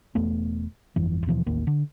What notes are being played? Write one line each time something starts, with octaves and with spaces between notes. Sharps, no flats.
E1 E2 A3 B3
G1 F2 E3
D#2 B2 E3 F3
A1 D#2 D#3 A#3
D3